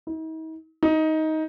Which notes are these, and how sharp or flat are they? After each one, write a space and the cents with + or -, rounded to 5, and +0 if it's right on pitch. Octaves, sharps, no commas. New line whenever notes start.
D#4 +45
D#4 +15